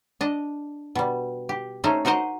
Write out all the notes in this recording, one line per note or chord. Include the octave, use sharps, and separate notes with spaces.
D4 D#5
B2 G3
G4
A3 C#4 D#4 C5
D#4 F#4 A#4 C5 D#5